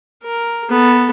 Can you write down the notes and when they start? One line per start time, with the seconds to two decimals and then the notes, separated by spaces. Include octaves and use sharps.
0.22 A#4
0.69 B3 A4